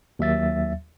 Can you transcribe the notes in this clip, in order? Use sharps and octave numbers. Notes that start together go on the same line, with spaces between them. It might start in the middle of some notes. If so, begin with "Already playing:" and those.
D#2 F#3 E5 A6